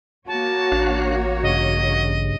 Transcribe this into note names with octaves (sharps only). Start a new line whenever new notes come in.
A#3 F#4 C#5 A5
A1 D4 F5 F#6
G2 C#3 D#5